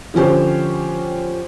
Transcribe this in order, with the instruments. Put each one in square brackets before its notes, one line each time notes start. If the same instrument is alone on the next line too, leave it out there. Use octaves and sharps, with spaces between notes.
[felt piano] D3 F3 C#4 G4 C5